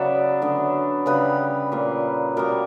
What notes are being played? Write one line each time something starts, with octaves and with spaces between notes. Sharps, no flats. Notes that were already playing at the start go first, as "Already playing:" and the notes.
Already playing: C#3 F#3 B3 D5 E5 F#5
D3 F#3 B3
C#3 G3 B3 B4
A#2 A#3
B2 G3 A#3 A#4